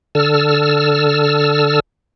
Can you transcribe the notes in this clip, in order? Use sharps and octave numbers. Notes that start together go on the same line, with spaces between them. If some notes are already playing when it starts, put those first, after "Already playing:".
D3 A4 E6 F6